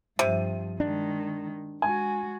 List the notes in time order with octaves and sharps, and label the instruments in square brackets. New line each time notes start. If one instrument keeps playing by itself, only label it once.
[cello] G2 F3 [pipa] C3 [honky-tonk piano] D#7
[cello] D#3 G#3 [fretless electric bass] D4
[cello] G#3 F#4 [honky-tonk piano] G#5